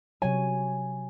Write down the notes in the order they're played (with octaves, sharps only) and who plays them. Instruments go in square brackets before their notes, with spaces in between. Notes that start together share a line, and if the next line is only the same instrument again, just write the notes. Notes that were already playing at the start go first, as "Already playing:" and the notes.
[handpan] C3 F#3 C#5 [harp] G#5